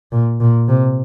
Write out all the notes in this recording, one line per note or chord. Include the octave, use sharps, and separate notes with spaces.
A#2
A#2
C3